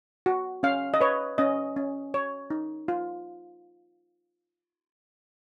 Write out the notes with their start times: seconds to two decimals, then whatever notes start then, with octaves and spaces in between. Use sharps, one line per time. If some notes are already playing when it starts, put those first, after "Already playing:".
0.26 F#4
0.63 C#4 F5
0.94 D#5
1.01 B4 C#5
1.38 C#4 D#5
1.76 C#4
2.14 C#5
2.50 D#4
2.88 F4